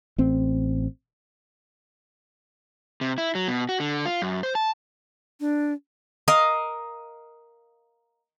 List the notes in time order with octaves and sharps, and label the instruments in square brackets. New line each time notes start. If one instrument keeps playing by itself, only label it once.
[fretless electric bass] A1 C4
[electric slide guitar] C3
E4
F#3
B2
F#4
D3
F4
F#2
C5
A5
[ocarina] D4
[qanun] A#4 D#5 F5